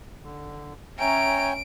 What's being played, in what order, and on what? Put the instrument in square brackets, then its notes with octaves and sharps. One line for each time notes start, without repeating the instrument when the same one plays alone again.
[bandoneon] D3
[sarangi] C#4 [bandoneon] C#5 G5 G#5 [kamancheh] E5 A#5 [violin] D7